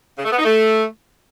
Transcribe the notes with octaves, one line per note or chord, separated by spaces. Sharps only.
C#3
A3
B3
D#4
A3